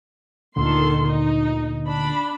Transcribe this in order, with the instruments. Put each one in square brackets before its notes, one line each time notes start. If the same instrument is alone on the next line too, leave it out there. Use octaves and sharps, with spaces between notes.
[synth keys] D2 A#2 D3 [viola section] D#3 A4 C6
[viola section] D#4
D4 B5